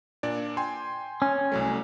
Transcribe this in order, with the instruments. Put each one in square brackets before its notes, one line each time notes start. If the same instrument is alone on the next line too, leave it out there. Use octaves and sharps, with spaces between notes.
[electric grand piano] A#2 D4 D5
G5 G#5 C6
[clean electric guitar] C#4
[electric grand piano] C2 F#3 A3